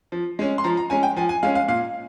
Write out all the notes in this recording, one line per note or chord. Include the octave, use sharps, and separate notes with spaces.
F3
G#3 C#4
C6
F3 A#5
A#5
G#3 C#4 G#5
G5
F3 G#5
G#5
G#3 C#4 F5
F5
A#2 F5